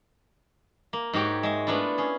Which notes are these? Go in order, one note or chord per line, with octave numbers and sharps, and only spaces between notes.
A#3
G#2 F#4 G4 C#5 G5
G#3 E5
A3 B3 D4 E4 F4
C#4 G#4